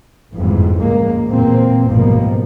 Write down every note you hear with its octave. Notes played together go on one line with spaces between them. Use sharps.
G1 F2 G#2 E3
C#2 A#2 G#3 A#3
E2 A#2 A#3 C4
G#1 C#2 G2 B2 F3 A#3